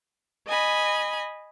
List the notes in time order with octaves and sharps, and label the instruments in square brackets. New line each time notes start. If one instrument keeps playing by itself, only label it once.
[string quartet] D#5 G#5 B5